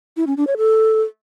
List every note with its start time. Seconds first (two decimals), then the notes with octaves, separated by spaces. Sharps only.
0.17 E4
0.27 C#4
0.37 D4
0.47 C#5
0.57 A4